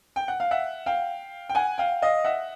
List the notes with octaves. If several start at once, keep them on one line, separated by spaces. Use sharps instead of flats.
G5
F#5
F5
E5 F#5
F5 G5
G5
F#5 G#5
F5 G5
D#5 F5
E5 F#5